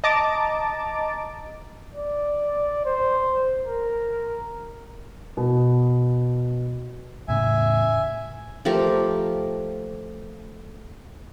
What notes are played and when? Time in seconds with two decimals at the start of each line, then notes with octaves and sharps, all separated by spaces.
0.04 D#5 A5 A#5 D6 A6 D7
1.95 D5
2.86 C5
3.67 A#4
5.37 B2
7.28 E2 A2 C#3 E5 G#5
8.65 F3 A3 G4 A#4